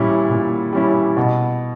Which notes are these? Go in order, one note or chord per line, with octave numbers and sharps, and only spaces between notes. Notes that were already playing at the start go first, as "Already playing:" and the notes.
Already playing: A#2 G3 C#4 E4
A#2
G3 C#4 E4
B2